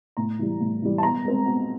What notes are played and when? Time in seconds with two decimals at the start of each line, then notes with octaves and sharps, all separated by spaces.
0.17 A2 A#5
0.39 E3 G3
0.61 A2
0.82 E3 G3
0.98 A5
1.03 B2 A#5
1.25 G#3 C4
1.45 B2